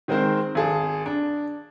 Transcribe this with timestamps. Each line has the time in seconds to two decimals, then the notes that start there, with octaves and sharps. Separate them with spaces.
0.08 D#3 G#3 C4 A#4 C5
0.55 G#1 G#4 A5
1.06 D4